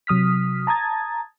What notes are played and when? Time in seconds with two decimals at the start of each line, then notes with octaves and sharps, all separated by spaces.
0.07 C3 F#3 D#6 F6 B6
0.67 A5 A#5 D#6 G#6 A6